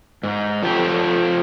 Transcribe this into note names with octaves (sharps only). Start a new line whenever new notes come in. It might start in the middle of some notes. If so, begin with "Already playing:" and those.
G#2
F3 G4 A4